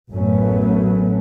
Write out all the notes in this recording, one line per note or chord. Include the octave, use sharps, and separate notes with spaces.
A1 F#2 F#3 A3 B3 C#4